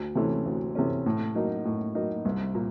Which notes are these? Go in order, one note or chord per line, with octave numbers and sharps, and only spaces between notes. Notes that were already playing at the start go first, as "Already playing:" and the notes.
Already playing: D2
C3 E3 A3 C#4
D2
C3 E3 A3 C#4
A2
F#3 A#3 D#4
A2
F#3 A#3 D#4
C2
A#2